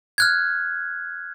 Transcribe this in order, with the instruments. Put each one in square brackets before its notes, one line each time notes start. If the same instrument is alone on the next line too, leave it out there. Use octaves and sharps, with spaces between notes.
[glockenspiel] F6 F#6 G#6